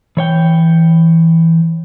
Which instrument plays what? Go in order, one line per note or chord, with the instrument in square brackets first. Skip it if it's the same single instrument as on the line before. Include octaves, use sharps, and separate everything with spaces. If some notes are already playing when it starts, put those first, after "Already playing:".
[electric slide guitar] E3 C#5 G5